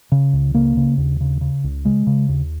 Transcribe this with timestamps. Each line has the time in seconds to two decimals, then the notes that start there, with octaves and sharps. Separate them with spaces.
0.12 C#3
0.33 C#2
0.54 C#3 A#3
0.77 C#3
0.98 D#2
1.21 C#3
1.41 C#3
1.64 C#2
1.85 C#3 G#3
2.07 C#3
2.29 D#2